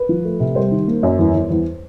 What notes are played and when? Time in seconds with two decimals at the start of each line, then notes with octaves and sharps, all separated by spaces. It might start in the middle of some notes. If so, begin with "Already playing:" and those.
Already playing: B4
0.09 F3
0.25 A3
0.40 C3
0.55 G3 C5
0.71 D#3
0.88 A#3
1.03 F#2
1.19 E2
1.34 E2
1.50 E2